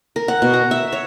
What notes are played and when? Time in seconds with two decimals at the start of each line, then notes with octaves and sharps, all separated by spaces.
0.16 A#4
0.28 F#5
0.42 B2
0.54 A#5
0.71 E5
0.93 C#5